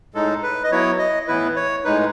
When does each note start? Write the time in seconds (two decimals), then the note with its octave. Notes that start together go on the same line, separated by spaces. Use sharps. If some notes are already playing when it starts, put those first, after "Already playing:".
0.14 A2 G#3 D#4 A4
0.43 B4
0.64 D#5
0.72 F#3 B3 E4 C#5
0.99 D#5
1.27 A2 E3 B3 E4 B4
1.56 C#5
1.85 A2 G#3 D#4 B4